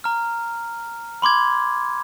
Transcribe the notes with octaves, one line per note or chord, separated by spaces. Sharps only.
A#5 F6
B5 C6 D6 G#6